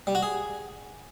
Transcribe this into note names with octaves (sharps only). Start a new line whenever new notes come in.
G3
F#4
G#4